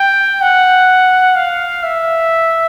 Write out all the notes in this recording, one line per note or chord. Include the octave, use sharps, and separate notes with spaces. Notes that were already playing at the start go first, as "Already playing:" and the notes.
Already playing: G5
F#5
F5
E5